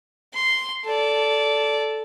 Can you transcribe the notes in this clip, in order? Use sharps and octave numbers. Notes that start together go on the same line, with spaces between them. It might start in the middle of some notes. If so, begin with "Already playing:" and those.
C6
A4 D5